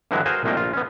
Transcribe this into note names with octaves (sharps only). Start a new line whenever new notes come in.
G2 D3 E3 F#3 G#3 E4
F#4 G#4 A#4 C5 F5 G#5
C2 A#2 A3 A#3 D#4 G5
A#1 F4
B3 C#4